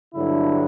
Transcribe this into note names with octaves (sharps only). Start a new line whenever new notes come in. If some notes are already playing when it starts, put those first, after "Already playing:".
G2 D3 F#3 E4